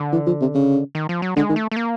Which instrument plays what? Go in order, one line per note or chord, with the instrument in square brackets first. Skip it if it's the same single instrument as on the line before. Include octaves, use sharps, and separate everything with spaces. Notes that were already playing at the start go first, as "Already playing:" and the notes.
Already playing: [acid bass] D3
[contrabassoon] E3
F3
C3
C#3
[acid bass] D#3
F3
F#3
[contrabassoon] D3 [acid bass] G#3
[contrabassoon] D#3
[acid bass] A3
A3
A#3